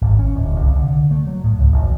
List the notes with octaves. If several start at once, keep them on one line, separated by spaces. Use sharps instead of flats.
G#1
C#4
D1
C2
D3
A3
F#3
A2
C#2
G#1